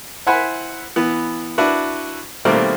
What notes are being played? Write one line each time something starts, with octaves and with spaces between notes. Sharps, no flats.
E4 C5 E5 F#5 G#5 B5
E3 B3
D4 E4 F#4 B4
B2 D#3 G3 A3 A#3 C4